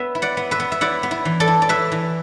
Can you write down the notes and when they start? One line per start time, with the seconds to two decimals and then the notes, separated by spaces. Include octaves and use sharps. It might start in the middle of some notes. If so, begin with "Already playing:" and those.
Already playing: B3 B4 E5
0.15 E4
0.22 D5 F#5
0.37 B3
0.51 B4 E5
0.60 B3
0.72 E5
0.81 E4 D5 F#5
1.03 B3
1.11 E4
1.25 E3
1.40 A4 D5
1.47 E4
1.62 D5
1.69 E4 B4 E5
1.92 E3